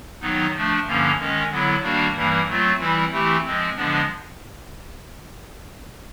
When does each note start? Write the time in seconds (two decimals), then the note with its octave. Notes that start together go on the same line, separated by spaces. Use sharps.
0.21 D#3 F#3 B3 D#4
0.53 F3 A3 D4
0.85 G2 D3 F3 A#3 C#4
1.18 D#3 G#3 C#4
1.50 D3 F#3 B3 E4
1.82 D#3 G3 A#3 D4 F#4
2.15 G2 E3 G3 A#3
2.46 F#3 A3 C4 F4
2.78 E3 G3 C4 E4
3.11 E3 A3 C4 E4 G4
3.44 F3 G#3 C4
3.75 D3 F3 G#3 B3 D4